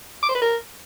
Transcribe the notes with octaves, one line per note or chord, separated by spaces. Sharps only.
D6
C5
B4
A#4